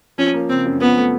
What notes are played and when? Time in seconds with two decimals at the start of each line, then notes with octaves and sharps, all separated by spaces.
0.18 F3 C#4
0.34 A#3
0.49 C#3 C4
0.65 F#2
0.81 F3 B3
0.97 A3